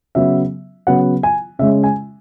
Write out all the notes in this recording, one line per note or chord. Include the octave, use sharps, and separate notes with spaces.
C#3 F#3 B3 E5
C#3 F#3 B3 F#5
G#5
C#3 G#3 C#4 E5
G#5